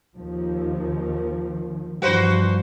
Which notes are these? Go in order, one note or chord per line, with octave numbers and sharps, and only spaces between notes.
D#2 D#3 F3
G2 E3 F3 F#4 B4 C5